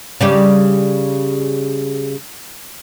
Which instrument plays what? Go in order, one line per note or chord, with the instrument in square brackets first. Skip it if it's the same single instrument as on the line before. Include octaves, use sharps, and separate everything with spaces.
[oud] C#3 G3 G4